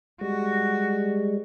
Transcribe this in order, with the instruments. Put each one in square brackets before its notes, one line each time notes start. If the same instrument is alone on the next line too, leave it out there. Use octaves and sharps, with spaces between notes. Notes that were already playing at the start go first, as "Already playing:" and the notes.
[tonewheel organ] G3 G#3 [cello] F#4